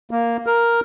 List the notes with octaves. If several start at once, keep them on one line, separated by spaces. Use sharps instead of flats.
A#3
A#4